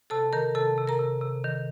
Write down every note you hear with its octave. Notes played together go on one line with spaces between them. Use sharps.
C3 A4 A5
D#3 A#4 A#5
C3 A4 A5
C3
A#4 A#5
C3
C3
D#3